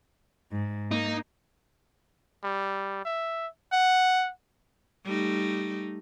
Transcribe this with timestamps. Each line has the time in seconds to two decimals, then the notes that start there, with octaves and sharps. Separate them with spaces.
0.52 G#2
0.91 A#3 D#4
2.44 G3
3.05 E5
3.73 F#5
5.05 G3 A3 D#4